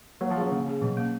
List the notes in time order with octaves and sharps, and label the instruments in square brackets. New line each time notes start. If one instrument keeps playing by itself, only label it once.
[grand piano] F#3 [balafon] A#3
[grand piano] F3
[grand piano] F#3 [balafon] C#4 G#4
[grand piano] C#3 [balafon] A#3
[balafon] C#4 G#4
[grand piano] B2 [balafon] F#3
[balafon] A#3 C#4